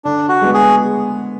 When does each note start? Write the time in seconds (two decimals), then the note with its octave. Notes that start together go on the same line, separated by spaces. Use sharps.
0.05 D3 D4
0.29 F#4
0.41 G#3 B3
0.54 G#4